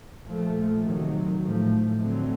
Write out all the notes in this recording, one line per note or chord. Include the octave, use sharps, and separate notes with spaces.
A#2 F3 A3
C3 D#3 F#3
A2 F3 A3
D3 F#3 A3 C4